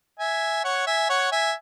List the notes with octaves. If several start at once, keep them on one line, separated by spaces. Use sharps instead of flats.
E5 G#5
C#5 F#5
E5 G#5
C#5 F#5
E5 G#5